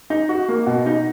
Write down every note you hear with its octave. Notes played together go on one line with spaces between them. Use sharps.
D#4
F#4
A#3
B2
D#4